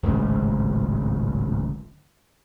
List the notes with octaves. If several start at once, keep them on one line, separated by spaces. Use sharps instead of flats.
D1 G#1 C#2